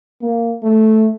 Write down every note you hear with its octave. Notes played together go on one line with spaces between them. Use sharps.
A#3
A3